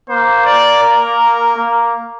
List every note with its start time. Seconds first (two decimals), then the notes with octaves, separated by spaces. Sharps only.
0.09 A#3 C5
0.45 D5
0.83 A#4
1.56 A#3